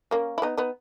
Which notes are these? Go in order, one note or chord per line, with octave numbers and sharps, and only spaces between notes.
A#3 C#4
E4
B3 D#4
B3 D#4